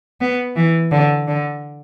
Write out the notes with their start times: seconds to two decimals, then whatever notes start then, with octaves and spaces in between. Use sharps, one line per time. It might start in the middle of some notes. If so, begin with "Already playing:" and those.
0.21 B3
0.56 E3
0.91 D3
1.28 D3